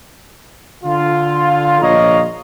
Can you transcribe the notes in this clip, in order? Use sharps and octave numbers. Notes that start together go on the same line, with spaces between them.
D3 F4
A#1 C#5 D#5 F5 A#5